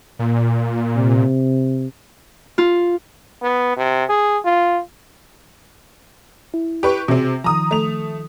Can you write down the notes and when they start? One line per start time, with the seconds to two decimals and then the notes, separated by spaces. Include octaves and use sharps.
0.19 A#2
0.96 C3
2.58 F4
3.43 B3
3.77 C3
4.10 G#4
4.45 F4
6.54 E4
6.83 G4 B4 C#6
7.08 C3 C4 F#4 G#4 C5
7.44 D#3 F3 A#5 D#6
7.71 A3 F7